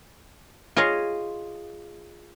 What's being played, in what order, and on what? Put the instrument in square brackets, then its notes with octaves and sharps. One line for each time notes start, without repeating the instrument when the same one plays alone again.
[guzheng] F4 G#4 C#5 D#5 F5